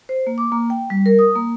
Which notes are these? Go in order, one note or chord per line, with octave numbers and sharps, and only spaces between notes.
C5
A#3
D6
A#3
G5
G3
A#4
D#6
A#3